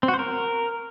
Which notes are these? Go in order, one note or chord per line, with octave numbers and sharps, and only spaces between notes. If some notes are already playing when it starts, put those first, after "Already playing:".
C4
F#4
C5
A#4